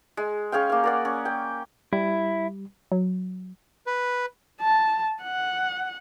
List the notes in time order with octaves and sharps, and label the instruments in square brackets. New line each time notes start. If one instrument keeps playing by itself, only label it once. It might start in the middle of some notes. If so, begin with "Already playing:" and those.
[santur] G#3
C#4 G#4 F5 G5
A#3 F5
A#4 D5 F#5
C#4
G5
[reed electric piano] G3 [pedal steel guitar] E4
[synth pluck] F#3
[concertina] B4
[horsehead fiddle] A5
F#5